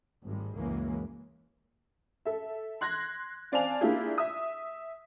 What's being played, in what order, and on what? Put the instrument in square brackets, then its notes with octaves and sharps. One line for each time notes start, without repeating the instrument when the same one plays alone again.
[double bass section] G#1 A2 G3 G#3
C#2 F#2 E3 G#3 A#3 C#4
[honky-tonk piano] A4 E5
C6 F#6 G#6 A#6
C4 D5 F5 G#5 A5 F7
A#3 D4 E4 F4 G4 G#4
E5 D#6